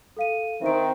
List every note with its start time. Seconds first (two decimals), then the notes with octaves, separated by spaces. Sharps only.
0.17 A4 F5 D#7
0.62 D#3 C4 E5 D7